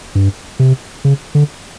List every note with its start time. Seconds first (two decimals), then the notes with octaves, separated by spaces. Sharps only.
0.15 G2
0.59 C3
1.05 C#3
1.35 D3